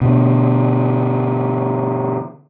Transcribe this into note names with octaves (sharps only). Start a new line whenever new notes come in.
B2 D3